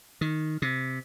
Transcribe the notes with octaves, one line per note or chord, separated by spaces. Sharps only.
D#3
C3